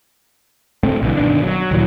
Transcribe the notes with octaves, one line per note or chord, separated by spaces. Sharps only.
D2 A2 A3 C4
B1 D3 E3
G1 B2 D#3 D4
F#3
D#2 A#2 E3 F#3